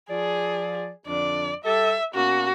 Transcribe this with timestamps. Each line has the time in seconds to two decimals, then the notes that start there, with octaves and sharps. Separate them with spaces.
0.10 F3 G#4 D5
1.07 F2 D3 D4 D5
1.64 G3 G4 A4 E5
2.14 B2 A#3 C#4 F#4